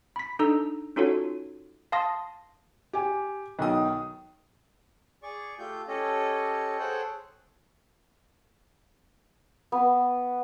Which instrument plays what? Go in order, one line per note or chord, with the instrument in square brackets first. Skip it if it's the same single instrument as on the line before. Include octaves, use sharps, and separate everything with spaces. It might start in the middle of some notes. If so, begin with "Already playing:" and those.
[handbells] B5 B6
D4 D#4 A4 A#5 E6
C#4 D#4 F4 F#4 A4 C#5
F5 A5 C6 D#6 A#6
[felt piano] G4 G#5
[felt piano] B1 [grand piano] D#3 D#6
[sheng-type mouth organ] G#4 D5 C#6
A3 F4 G4 G6
C#4 G4 A4 C#5 D#5
G#4 A4 C5 C#5 F#5 G5
[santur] B3